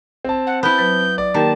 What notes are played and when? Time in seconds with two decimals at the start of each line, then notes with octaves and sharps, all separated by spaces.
0.25 C4 A5
0.47 F#5
0.63 B3 E4 G6
0.78 F#3 B4 A6
1.18 D5
1.34 D#3 A#3 G4 A5